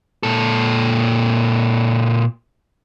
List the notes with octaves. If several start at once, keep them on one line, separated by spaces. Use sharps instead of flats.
A#2 A4